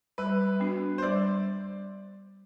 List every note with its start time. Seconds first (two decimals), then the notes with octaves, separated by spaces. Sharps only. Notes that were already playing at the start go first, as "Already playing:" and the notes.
0.18 G3 B4
0.60 B3 D4 F#4
0.98 C5
1.02 G3 D5